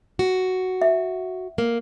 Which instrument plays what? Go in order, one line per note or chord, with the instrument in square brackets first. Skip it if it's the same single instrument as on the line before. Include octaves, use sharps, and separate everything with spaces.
[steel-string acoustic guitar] F#4
[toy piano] E5
[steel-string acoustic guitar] A#3